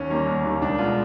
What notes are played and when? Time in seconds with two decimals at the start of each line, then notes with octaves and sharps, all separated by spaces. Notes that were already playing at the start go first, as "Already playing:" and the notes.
Already playing: D#2 C#4
0.10 D#3 G3 A#3
0.27 D#2
0.44 D#3 G3 A#3
0.62 C#2 D4
0.78 B2 G#3 F4